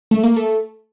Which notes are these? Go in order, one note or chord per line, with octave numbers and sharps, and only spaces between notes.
A3
A#3
A3